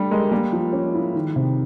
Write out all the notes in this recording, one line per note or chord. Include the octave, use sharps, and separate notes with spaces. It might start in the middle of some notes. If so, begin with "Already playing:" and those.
Already playing: G3 A3 D4 G4
G#3 A#4
G3 A#3
F3
C#4
E4
D#3
C3